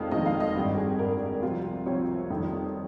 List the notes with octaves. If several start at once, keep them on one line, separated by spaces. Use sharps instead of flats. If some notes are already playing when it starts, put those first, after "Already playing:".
Already playing: F1 F2 D#3 G#3 C4 F5
F1 F2 D#3 G#3 C4 D#5
F5
D#5
G#1 G2 G3 G4
G#4
G#1 G2 G3 A#4
C2 C3 F3 C4 F4
C2 C3 F3 C4 C#5
F1 F2 D#3 G3 C4